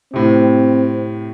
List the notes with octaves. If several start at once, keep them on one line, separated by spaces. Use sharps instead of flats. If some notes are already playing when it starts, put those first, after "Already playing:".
A2 C3 C4